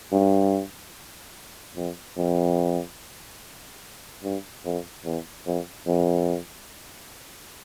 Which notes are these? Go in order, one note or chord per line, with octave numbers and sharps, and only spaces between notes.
G2
F2
F2
G2
F2
E2
F2
F2